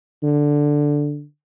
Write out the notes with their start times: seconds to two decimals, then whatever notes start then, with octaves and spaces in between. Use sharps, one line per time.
0.23 D3